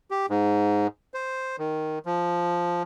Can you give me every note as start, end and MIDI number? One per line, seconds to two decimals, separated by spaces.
0.11 0.26 67
0.30 0.87 44
1.14 1.56 72
1.59 1.99 51
2.06 2.83 53